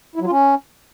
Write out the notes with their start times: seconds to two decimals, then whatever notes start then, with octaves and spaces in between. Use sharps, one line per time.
0.16 E4
0.21 F#3
0.26 F4
0.31 C#4